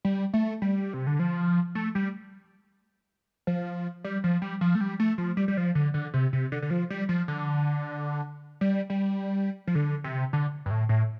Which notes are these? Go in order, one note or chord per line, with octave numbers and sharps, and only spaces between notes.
G3
A3
G3
C3
D3
F3
A3
G3
F3
G3
F3
G3
F3
A3
G3
A3
F3
G3
G3
F3
D3
D3
C3
C3
D3
D3
F3
G3
F3
D3
G3
G3
F3
D3
C3
D3
G2
A2
A2